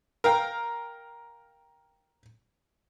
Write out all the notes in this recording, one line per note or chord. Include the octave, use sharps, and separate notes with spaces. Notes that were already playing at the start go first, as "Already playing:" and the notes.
A#4 F5 G5